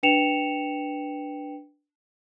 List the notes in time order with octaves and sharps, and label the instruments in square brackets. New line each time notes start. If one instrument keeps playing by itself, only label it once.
[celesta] D4 B4 G5 C#7 E7 F7